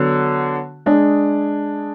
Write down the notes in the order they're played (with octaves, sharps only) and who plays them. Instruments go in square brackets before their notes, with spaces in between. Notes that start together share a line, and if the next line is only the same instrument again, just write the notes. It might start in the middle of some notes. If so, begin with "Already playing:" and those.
Already playing: [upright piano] D3 F#3 B3 F#4
G#3 D4 G#4